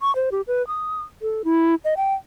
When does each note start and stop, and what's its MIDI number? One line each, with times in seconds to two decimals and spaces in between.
0.01 0.14 85
0.16 0.30 72
0.32 0.41 67
0.47 0.65 71
0.67 1.02 87
1.22 1.42 69
1.44 1.75 64
1.85 1.94 75
1.97 2.14 79